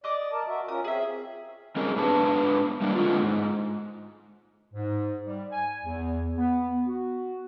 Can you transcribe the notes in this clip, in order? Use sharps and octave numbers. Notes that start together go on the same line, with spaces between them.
D5 D#5 D6 D#6
A#4 A5
F#4 E5
C#4 F4 A#4 D#6
C4 G#4 E5
G3 C4 C#4 D#4 G#4 A#4
G#2 B3 D4 B4 A5
G3 A#3 D4
D3 G#3 F4
G#2
G#2
G3
G#5
E2
B3
F#4